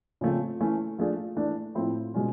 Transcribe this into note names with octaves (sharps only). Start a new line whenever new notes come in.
C#3 F3 A3 C4
E3 A3 C#4
F3 A3 D4 F4 G#4
E3 A3 D4
A2 F3 A3 C4 E4
B2 G#3 C#4 F4